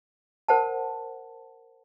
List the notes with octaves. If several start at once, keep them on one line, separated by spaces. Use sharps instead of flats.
A#4 C5 F#5 A5